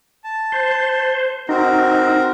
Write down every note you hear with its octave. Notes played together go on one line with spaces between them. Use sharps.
A5
C5
C4 D#4 F#4 A#4